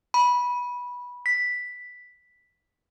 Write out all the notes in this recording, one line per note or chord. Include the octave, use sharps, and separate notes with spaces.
B5
B6